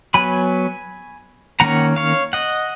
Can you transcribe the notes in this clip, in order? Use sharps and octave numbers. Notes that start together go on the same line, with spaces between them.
F#3 B3 G#5 B5
D#3 A#3 C#4 F#5 A#5
C#5 F5
D#5 F#5